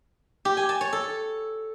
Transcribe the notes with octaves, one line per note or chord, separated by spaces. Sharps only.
G4
G#5
A5
C#5
A4